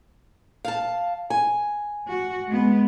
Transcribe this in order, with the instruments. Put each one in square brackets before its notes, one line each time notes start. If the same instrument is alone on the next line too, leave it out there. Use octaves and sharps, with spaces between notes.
[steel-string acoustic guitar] F5 A5
G#5
[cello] F#4
G#3 B3